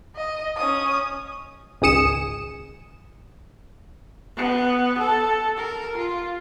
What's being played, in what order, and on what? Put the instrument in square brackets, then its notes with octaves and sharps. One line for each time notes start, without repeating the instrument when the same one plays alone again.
[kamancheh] D#5
C#4 D#6
[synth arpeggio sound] G#1 C#2 G#4 D#6 C#7 E7
[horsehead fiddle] B3
A4
A#4
F4